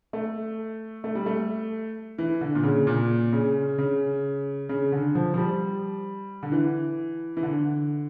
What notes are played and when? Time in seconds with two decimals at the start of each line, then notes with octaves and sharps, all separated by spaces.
0.13 A3
1.04 A3
1.15 G3
1.26 A3
2.18 E3
2.41 D3
2.55 A#2
2.63 C#3
2.87 A#2
3.33 C#3
3.78 C#3
4.69 C#3
4.92 D3
5.15 F3
5.34 F3
5.38 G3
6.43 D3
6.52 E3
7.37 E3
7.43 D3